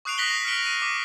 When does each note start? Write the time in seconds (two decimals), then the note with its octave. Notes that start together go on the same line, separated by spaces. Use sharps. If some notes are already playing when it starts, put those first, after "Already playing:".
0.05 C#6 D#6 F#6 C7 D7 F7
0.18 F#6 A#6 B6 F#7 G7
0.30 B6
0.45 F6 B6 C#7 D7 G7
0.63 B6 D#7
0.82 D6